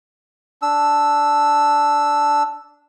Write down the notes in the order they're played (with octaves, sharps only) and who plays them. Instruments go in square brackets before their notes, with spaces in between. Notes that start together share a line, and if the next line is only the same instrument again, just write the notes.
[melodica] D4 E6